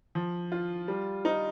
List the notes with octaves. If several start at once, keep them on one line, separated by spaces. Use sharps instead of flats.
F3
F4
G3
D#4